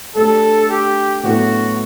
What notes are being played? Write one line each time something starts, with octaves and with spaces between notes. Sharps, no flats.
A3 D4 G4 A4
G4
A2 F#3 B3 E4 F#4 A4